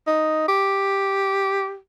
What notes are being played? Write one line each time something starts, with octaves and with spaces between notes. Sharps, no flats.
D#4
G4